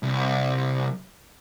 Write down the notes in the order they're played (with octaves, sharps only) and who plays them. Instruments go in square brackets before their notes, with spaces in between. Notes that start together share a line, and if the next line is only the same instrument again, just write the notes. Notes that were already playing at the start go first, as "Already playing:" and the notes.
[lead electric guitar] C2